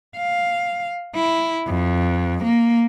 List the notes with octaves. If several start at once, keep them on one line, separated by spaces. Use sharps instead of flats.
F5
E4
F2
A#3